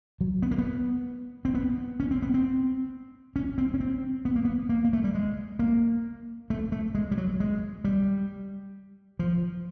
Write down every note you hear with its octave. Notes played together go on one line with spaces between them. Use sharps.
F#3
B3
A#3
B3
C4
B3
C#4
C4
B3
C4
C#4
C4
C#4
C4
B3
A#3
B3
A#3
A#3
A3
G3
G#3
A#3
A3
A3
G#3
G3
F#3
G#3
G3
F3